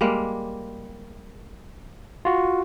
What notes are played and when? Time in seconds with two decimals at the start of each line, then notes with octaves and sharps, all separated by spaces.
0.01 G3 G#3 A#3
2.25 F4 F#4